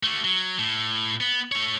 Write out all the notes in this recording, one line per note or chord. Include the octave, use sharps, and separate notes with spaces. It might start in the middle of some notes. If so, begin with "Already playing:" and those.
A3 F#4
F#3
A2
B3
A3 C#5